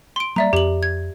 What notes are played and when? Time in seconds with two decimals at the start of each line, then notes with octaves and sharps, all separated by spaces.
0.16 C6 D7
0.36 F#3 G3 A#3 D5 E5 A#5
0.53 F2 G4 F#7
0.83 G#6